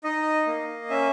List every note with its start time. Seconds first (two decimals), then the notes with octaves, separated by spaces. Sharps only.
0.04 D#4 D#5
0.47 A#3
0.90 C#4 E5